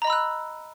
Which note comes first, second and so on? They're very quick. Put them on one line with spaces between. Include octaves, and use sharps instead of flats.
A#5 D#5 B5 E6 F#6